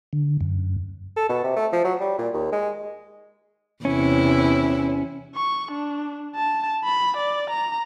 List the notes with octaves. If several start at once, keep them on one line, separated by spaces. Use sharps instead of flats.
D3
F#2
A4
B2
C3
A3
F3
F#3
G3
A#2
D#2
G#3
E2 C3 C#4 E4
C#6
D4
A5
B5
D5
A#5